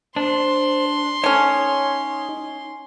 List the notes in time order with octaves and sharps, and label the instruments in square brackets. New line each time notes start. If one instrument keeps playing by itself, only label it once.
[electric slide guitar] D4 [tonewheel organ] C5 [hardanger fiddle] C6
[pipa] A3 C#4 [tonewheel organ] D#4 [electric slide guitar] C#5